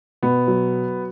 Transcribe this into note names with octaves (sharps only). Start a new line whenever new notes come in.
B2 B3
F#3